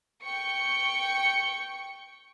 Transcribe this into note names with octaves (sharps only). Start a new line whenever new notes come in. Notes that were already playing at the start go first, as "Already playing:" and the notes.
G5 C#6 C#7